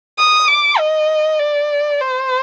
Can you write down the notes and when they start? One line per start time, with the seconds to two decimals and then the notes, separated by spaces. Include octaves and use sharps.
0.18 D#6
0.48 D6
0.78 D#5
1.40 D5
2.01 C5